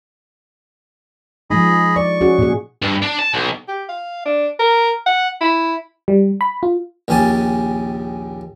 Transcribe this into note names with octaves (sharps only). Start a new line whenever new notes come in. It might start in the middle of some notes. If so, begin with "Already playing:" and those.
F3 G#3 D#4 G#4 D#5 B5
D5 C#6
C#4 F#4 G#4
A#2 G#4
G2
D4
A5
B1
G4
F5
D4
A#4
F#5
E4
G3
B5
F4
A#1 D#2 C#4 G4 G#5 A5